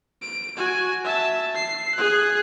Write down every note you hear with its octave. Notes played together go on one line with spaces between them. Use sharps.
D7
F#4 G#5
E5 A5
C7
G#4 F#6